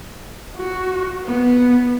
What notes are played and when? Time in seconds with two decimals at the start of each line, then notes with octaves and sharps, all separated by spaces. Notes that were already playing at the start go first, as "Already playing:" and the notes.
0.57 F#4
1.24 B3